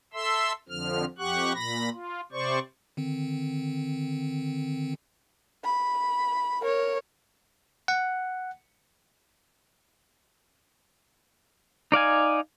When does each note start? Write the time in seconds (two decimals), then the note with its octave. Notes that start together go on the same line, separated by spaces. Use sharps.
0.13 A4 E5 C6 E6
0.69 F2 D3 F3 F6
1.18 F2 G4 F#5 C#6 F#6
1.54 A#2 B5 A#6
1.93 F4
2.32 C3 C5 D5 C#6
2.97 D3 D#3 C4
5.64 B5
6.61 A#4 C#5
7.88 F#5
11.92 D#4 D5 F5 G#5